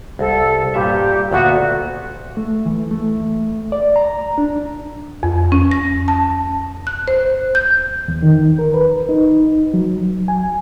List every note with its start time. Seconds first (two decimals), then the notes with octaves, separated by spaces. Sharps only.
0.19 C2 A4
0.74 G2 A#2 G4 E5
1.31 D2 A#2 B3 F#4
2.37 A3
2.66 E3
2.91 A3
3.72 D5
3.96 A#5
4.38 D4
5.23 F2
5.52 C#4
5.71 A#6
6.08 A5
6.87 F#6
7.08 C5
7.55 G6
8.08 E2
8.22 D#3
8.59 A#4
8.74 B4
9.09 D#4
9.74 F#3
10.28 G#5